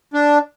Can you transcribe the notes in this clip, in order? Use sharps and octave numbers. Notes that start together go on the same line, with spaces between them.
D4